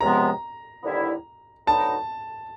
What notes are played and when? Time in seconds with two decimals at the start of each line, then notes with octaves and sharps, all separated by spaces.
0.01 C#2 C3 F3 G#3 B3 A#5
0.83 D#2 D3 G3 B3 E4
1.67 D2 D3 F#3 B3 D#4 A5